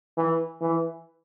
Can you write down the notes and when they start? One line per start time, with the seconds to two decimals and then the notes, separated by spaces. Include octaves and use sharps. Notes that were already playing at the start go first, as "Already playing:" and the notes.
0.17 E3
0.61 E3